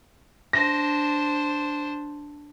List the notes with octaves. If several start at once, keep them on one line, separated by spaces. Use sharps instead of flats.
D4 C5 A#6